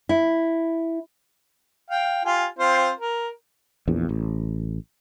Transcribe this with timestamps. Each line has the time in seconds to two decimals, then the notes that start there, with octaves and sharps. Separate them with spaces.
0.09 E4
1.90 F5 G5
2.25 F4 G4 G#5
2.59 C4 F4 C5
2.99 A#4
3.88 A#1 E2
4.09 A1